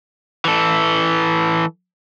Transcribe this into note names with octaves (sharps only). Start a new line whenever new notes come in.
E3 A4